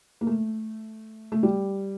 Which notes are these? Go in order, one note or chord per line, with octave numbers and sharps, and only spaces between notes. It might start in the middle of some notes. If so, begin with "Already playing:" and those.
A#3
A3
A3
G3